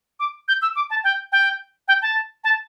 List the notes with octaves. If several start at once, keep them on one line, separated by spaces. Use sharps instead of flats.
D6
G6
E6
D6
A5
G5
G5
G5
A5
A5